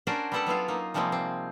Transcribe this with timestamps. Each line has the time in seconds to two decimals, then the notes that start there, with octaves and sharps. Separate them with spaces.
0.07 C#4 D4 F#4 A#4 C5 D5
0.32 G3 B3 G4 A4 F#5 A5
0.46 F#3 B3 E4 F4
0.68 A#3 D#4
0.94 C3 F3 G3 G#3 A#3 C4
1.12 C4